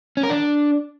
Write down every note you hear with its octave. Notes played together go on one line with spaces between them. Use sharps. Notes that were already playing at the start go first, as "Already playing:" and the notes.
C#4
A#4
D4